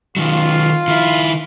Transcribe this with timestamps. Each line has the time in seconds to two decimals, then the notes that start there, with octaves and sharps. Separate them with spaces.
0.17 D#3 F#3 F4
0.88 D#3 E4